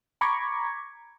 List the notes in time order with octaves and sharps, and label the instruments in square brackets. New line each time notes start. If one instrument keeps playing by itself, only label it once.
[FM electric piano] A#5 B5 C#6 D6 G#6